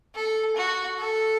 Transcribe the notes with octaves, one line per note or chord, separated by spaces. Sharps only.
A4
F#4
A4